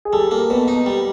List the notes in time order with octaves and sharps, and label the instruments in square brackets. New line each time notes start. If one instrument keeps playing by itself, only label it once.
[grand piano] G#4
[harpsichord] G3 [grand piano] A4
[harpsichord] A#3 [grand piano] A#4
[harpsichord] B2 [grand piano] B4
[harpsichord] D#4
G3